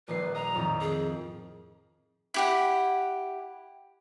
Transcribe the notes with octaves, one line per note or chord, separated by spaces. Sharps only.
D#1 A#1 B4 C7
D#5 A#5
F2 A2 D#3
G#4
E4 G4 F#5